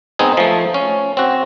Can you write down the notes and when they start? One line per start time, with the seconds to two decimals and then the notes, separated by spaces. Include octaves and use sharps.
0.19 B3 C4 D#4 G#4
0.37 F3 A3
0.74 C#4
1.17 C4 F#4